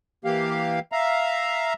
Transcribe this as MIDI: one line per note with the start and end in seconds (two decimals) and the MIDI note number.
0.25 0.79 52
0.25 0.79 58
0.25 0.79 67
0.25 0.79 77
0.92 1.74 76
0.92 1.74 77
0.92 1.74 82